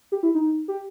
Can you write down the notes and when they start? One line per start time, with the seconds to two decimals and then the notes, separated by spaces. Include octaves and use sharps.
0.12 G4
0.23 E4
0.35 D#4
0.68 G4